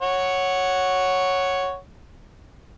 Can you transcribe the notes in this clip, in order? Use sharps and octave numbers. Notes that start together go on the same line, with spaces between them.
C#5 F#5